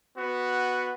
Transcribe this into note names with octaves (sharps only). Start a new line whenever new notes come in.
B3 F#4